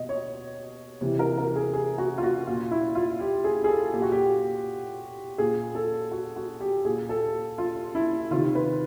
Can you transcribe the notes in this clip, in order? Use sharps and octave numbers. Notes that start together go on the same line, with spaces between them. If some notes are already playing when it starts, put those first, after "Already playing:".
Already playing: B2 D#5
C#5
C3 E3
A#4
A#4
G#4
G#4
F#4
F4
F#4
A#2 F4
E4
F4
G4
G#4
G#4
A4
A#2 G4
F#4
G4
A#2 G#4
A4
F#4
F#4
G4
A#2 G#4
A4
F4
E4
C3 D#3 F4
B4